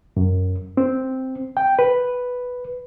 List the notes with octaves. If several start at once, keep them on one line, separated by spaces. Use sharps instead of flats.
F#2
C4
G5
B4